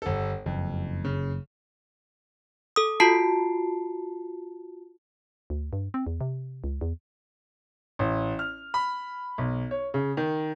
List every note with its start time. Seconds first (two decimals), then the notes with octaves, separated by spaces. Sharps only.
0.02 G1 A4
0.46 F#1 F2
1.04 C#3
2.76 A4 D#6
3.00 F4 F#4 A5 C7
5.50 D2
5.73 G2
5.94 C4
6.07 E2
6.21 C3
6.64 C#2
6.81 E2
7.99 A1
8.39 F6
8.74 B5
9.38 B1
9.71 C#5
9.94 C#3
10.17 D#3